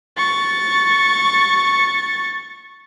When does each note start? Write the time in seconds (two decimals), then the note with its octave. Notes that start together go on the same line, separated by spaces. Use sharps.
0.17 C#6 A6